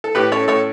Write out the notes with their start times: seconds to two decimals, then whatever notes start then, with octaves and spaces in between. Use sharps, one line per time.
0.04 A4
0.15 A2 G4 B4
0.32 C#4 A4 C#5
0.48 A2 A4 C#5